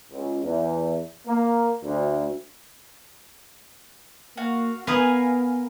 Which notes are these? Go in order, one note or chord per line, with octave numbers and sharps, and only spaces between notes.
C#2
E2
A#3
D2
A#3 F#4 F5
B3 A#4 B4 F5 G#5 D#6